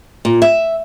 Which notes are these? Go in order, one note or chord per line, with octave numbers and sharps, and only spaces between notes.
A#2
E5